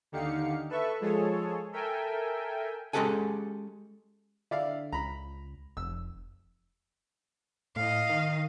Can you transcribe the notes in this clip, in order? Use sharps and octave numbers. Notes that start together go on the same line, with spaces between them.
D#2 D3 D#4 G4 F5 C#7
A4 B4 E5 C#6
F3 G#3 G#4 A4 C#5
A4 A#4 E5 G5 G#5
G#3 C#4 G4 A4 F#5 G#5
D3 E4 D5 F5
C#2 A#5 B5
F1 E6
A2 D#5 F5
D#3